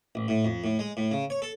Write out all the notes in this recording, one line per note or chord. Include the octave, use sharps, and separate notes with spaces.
A1
A2
F2
A2
G#3
A2
C#3
C#5
A4